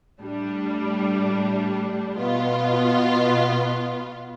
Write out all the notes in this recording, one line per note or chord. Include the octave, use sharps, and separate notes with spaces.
A2 G3 D4
B2 B3 F4